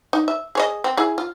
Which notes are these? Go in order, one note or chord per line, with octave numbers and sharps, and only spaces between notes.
D#4
E5
G#4 C#5 D#5
C4
E4 G#4
F4